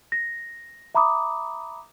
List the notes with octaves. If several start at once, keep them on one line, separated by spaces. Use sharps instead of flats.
A#6
E5 A#5 B5 D6 D#6